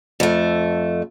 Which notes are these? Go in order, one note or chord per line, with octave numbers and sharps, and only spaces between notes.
F2 A3